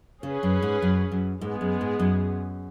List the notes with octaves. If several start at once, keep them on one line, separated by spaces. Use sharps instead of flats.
C#3 C#4 G#4 B4
F#2
G#2
F#2
F#2
G#2 G#3 B3 G#4
F#2
G#2
F#2